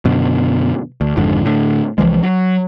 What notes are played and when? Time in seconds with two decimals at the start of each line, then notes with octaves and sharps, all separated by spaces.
0.05 F#2 B2 D3
1.01 D2
1.17 G#1 F2 G#2 D3
1.45 A2 D3
1.98 C2 E3 F3 G#3
2.23 F#3